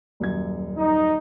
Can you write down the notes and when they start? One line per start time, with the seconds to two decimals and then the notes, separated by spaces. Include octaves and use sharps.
0.20 D#1 F#2 G#6
0.77 D#4